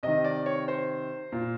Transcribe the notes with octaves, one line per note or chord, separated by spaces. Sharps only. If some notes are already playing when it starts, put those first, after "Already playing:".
C3 D#3 D#5
D5
C#5
C5
A#2